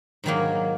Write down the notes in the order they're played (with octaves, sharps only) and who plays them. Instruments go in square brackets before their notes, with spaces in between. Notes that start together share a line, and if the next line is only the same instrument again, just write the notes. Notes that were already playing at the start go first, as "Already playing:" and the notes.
[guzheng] G#2 D#3 F#3 A#3